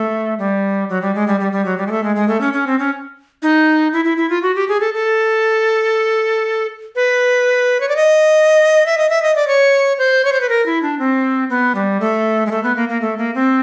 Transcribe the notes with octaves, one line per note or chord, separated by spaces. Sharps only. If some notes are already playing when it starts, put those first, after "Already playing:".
Already playing: A3
G3
F#3
G3
G#3
G3
G3
G3
F#3
G3
G#3
A3
G#3
G#3
A3
C#4
C#4
C4
C#4
D#4
E4
E4
E4
F4
F#4
G4
G#4
A4
A4
B4
C#5
D5
D#5
E5
D#5
E5
D#5
D5
C#5
C5
C#5
C5
B4
A#4
E4
D4
C4
B3
G3
A3
G#3
A3
B3
A#3
A#3
A3
A#3
C4